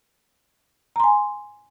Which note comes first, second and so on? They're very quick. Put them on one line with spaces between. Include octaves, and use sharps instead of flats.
A#5 C6 G#5